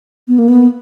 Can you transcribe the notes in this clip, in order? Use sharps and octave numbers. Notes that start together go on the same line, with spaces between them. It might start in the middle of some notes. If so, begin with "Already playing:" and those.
B3
A#3
B3